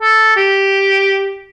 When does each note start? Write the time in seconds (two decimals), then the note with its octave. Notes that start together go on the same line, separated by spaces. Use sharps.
0.01 A4
0.36 G4